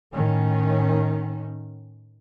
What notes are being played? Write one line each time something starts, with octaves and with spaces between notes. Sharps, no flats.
A2 D#3 C#4